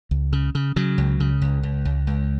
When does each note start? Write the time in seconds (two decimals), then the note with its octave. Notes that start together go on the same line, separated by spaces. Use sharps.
0.11 C#2
0.33 C#3
0.55 C#3
0.76 C#3 F#3
0.98 C#2
1.20 C#3
1.42 C#2
1.63 C#2
1.85 C#2
2.07 C#2